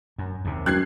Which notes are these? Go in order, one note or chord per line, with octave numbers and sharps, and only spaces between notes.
F#2
D#2 C3
F#2 F#6 G#6 C7